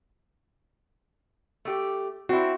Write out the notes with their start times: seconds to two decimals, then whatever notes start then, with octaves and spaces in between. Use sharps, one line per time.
1.65 A3 G4
2.29 C4 E4 F#4